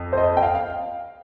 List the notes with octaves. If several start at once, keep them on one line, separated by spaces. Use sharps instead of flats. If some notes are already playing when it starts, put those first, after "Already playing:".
Already playing: F2
C5
D#5
G5
F5
F5